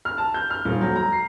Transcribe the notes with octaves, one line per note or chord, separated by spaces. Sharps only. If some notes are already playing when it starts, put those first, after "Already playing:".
F6
A5
G6
F6
D#1
F#3
A#5
C7